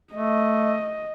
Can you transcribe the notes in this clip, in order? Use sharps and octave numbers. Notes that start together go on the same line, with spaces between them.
A3 D#5